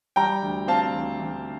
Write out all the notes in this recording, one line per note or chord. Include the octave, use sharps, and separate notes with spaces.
G3 G5 A#5
D2
C4 F5 A5
D2
D2